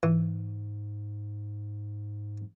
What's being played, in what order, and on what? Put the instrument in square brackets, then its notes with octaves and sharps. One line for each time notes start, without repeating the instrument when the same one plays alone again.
[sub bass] G#2 [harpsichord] E3